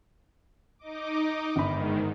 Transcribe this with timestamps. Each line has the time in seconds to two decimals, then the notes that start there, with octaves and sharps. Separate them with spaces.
0.79 D#4 D#5 D6
1.56 G1 G#2 D#3 B5